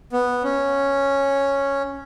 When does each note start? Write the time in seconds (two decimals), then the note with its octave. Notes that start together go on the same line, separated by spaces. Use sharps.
0.13 B3
0.43 C#4